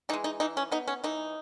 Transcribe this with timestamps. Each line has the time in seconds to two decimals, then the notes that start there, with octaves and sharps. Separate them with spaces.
0.09 E3 D#4
0.13 G#3
0.24 D#4
0.40 E3 D#4
0.57 C#4
0.72 B3 D#4
0.88 C#4
1.04 E3 D#4